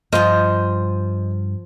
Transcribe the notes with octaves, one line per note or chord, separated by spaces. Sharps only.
G2 F3 F4 C5 D#5 G5